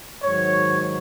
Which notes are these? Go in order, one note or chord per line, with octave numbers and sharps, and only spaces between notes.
G#2 D#3 F#3 C#5